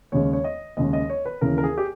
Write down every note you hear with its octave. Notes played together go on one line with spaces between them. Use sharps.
D#2 C#3 G#3 C#5
C#5
D#5
D#2 C#3 G#3 D#5
D#5
C#5
B4
D#2 C#3 E3 A#4
A#4
G#4
G4